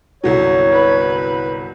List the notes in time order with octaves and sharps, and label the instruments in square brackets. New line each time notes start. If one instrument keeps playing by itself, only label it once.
[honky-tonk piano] G1 C2 F#3 [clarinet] C#5
[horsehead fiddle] B4